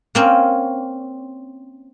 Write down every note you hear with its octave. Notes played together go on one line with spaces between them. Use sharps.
A#3 C4 C#4